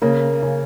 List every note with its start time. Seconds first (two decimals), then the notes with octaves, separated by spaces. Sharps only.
0.02 C#3 A#3 C#4
0.43 C#3